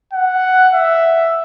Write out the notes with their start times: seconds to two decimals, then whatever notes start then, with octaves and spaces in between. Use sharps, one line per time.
0.13 F#5
0.74 E5